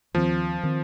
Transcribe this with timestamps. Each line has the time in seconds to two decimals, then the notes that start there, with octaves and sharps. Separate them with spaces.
0.14 D#2 D#3 F3 C4
0.63 D#3 C4